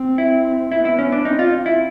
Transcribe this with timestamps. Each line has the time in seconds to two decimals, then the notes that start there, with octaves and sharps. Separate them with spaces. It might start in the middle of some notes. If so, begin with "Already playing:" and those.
Already playing: C4
0.18 E4
0.72 B3 E4
0.85 E4
0.99 C#4
1.12 D4
1.25 C4 D#4
1.39 F4
1.66 E4